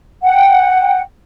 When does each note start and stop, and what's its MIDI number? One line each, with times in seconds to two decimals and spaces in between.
0.24 1.01 78
0.24 1.01 79